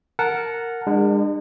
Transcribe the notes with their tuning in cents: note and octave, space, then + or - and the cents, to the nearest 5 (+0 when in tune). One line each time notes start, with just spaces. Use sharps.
A#4 -10 F#5 -5 A5 -20
G#3 -35 D4 +40